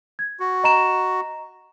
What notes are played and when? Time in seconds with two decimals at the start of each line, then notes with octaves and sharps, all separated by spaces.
0.19 G#6
0.40 F#4
0.64 D#5 A#5 E7